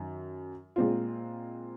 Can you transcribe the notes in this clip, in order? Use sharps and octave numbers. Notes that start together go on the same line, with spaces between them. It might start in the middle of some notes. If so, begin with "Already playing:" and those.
Already playing: F#2 D#3
A#2 G#3 C4 F4